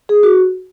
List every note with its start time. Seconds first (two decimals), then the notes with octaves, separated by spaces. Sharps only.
0.09 G#4
0.23 F#4